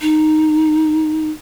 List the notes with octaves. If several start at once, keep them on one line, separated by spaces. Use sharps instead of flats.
D#4